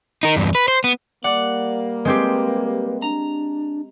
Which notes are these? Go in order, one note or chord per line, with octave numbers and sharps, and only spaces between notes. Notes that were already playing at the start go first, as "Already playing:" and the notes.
D#4 A#4
E2 G2
B4
C5
B3
G3 A#3 D5 F#5
G#3 C4 G4 B4
D4 A#5